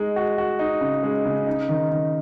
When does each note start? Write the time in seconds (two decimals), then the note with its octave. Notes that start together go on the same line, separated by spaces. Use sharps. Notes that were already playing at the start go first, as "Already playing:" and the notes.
Already playing: G#3 D#4
0.16 F#4
0.38 F#4
0.59 D#4
0.81 C#3
1.03 G#3
1.25 C#3
1.47 D#4
1.69 D#3
1.91 D#3